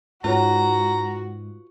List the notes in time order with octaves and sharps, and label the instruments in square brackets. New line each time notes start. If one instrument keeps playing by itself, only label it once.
[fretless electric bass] G#2 [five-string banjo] F4 B4 C#5 [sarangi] F#4 [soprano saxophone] A#5